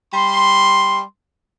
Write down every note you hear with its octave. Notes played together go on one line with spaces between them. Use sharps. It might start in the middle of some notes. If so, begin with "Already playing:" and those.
G3 C6